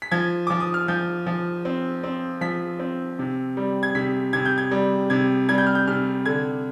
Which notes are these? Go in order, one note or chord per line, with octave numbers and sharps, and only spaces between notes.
B6
F3 G#6
F3 D6
D#6
F6
F3 G6
F3
C4
C4
F3 B6
C4
C3
G3
G#6
C3 B6
C3 G#6
G6
G#6
G3
C3 G#6
G3 G#6
G6
F6
G6
C3 F6
D3 G#6